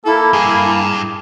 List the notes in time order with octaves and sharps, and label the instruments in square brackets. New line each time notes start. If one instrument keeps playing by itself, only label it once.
[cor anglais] A#3 [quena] E4 [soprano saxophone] A4
[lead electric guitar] G2 [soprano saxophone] G#4